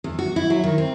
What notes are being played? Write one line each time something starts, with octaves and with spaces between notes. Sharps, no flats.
E2
F#4
E4
F#3
D#3
C4